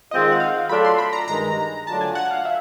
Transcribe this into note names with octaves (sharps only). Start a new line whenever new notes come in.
D#3 G#3 C4 F4 D#5
F#5
F5
F#3 A3 D4 F4 A4 B5
C6
B5
A#5
G2 D#3 G#3 A#5
D3 F#3 A3 D4 F4 A5
G#5
F#5
F5
E5